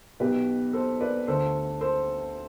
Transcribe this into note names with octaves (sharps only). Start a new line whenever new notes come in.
B1 B2 G4 B4
A4 C5
B4 D5
D2 D3 A4 C5
A4 C5